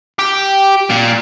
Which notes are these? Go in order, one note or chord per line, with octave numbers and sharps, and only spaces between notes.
G4
A#2